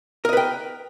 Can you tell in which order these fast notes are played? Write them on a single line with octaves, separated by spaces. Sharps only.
A#4 D#5 B4 G5